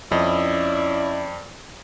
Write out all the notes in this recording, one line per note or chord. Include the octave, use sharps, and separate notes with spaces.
F2 C#4 E4 D5 D#5